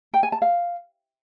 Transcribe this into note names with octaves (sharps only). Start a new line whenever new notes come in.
G5
G#5
A5
F5